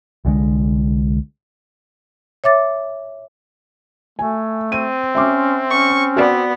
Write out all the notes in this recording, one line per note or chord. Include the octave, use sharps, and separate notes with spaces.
C2 D3 G3 G#3
C#5 E5 D6 A6
A3 G#5
C4 D#7
C#4 E5 C6 D6
C#4 C#6
B3 F#4 D5